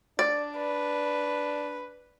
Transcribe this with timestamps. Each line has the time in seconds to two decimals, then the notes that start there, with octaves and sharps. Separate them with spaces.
0.19 D4 D5
0.58 B4